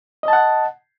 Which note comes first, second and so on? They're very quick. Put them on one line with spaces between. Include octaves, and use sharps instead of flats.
D#5 A5 F#5